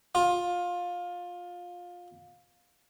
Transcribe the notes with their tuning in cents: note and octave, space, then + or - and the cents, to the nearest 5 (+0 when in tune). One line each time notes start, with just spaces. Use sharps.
F4 +20